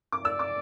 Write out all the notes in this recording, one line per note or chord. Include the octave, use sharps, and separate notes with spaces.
D6
D5 E6
D6